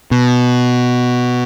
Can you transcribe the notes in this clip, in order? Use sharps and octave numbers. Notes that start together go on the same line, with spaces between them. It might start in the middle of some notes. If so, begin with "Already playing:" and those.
B2